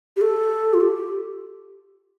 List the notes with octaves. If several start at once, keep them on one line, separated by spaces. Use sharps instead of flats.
G4
A4
F4
G4